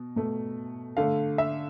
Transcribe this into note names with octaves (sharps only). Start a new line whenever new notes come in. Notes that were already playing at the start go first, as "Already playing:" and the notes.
Already playing: B2
B2 A3
D3 A3 F5
E5